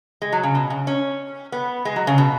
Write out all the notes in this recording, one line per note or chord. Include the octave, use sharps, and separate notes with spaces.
G#3
F#3
C#3
B2
C#3
C#4
B3
G#3
F#3
C#3
B2